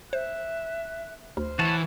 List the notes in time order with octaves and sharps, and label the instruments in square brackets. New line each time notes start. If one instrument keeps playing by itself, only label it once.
[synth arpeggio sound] C5 [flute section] E5 F#6
[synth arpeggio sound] D2 [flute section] C5 F6
[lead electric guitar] E3 [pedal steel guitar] F#4 C#5 A5